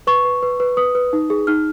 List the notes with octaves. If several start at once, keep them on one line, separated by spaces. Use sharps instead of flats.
B4 C#6
B4
B4
B4
B4 D#6
B4
D#4
G#4
D#4 F6